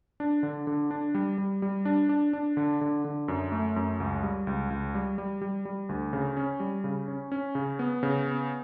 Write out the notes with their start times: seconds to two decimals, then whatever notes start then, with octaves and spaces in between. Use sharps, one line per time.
0.20 D4
0.43 D3
0.67 D3
0.91 D4
1.15 G3
1.38 G3
1.62 G3
1.85 D4
2.09 D4
2.33 D4
2.57 D3
2.81 D3
3.05 D3
3.28 F#2
3.52 A3
3.76 F#2
4.00 C#2
4.23 G3
4.47 C#2
4.70 C#2
4.95 G3
5.18 G3
5.41 G3
5.65 G3
5.89 D2
6.13 C#3
6.37 C#4
6.60 G3
6.84 C#3
7.08 C#4
7.32 C#4
7.55 C#3
7.79 B3
8.03 C#3
8.26 B3